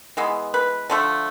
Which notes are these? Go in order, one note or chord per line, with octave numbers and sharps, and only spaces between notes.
E3 G#3 B3
B4
D3 F3 A3 A5